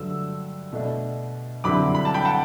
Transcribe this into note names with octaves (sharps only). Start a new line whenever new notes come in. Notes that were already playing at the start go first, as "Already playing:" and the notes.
Already playing: G2 D3 F#3 A3 E6
B2 A3 D4
G2 D3 F#3 C4 E4 B5 D6
B5
A5
G5 B5
F#5 A5